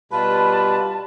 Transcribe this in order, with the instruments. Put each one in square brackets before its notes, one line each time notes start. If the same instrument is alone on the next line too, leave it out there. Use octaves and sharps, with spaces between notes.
[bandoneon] B2 F4 B4 [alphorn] G3 [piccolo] A5 [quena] B5